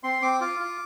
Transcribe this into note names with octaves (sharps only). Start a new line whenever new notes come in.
C4 C6
C4 D6
F4 D6
F4